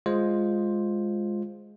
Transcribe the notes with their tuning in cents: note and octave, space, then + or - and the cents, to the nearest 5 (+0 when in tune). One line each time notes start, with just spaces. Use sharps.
G#3 +0 F4 +0 C5 +5